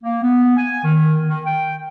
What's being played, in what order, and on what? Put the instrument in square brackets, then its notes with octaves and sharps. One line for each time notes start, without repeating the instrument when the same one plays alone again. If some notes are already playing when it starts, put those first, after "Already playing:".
[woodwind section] A#3
B3
G#5
D#3
D#3
G5